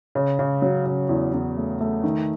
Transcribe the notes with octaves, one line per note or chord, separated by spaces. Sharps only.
C#3
C#3
F#3
C#3
E2
E2
A3
A3
D#3